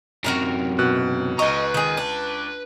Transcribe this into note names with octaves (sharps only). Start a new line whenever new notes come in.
F#2 C3 F#4 A#4 A#5
B2 F#6
C#2 B4 D#5 A#5 C#6
D#3 G#4
D4